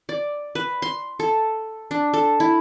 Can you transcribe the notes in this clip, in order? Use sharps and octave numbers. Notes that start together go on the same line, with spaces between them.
D5
B4
C6
A4
D4
A4
E4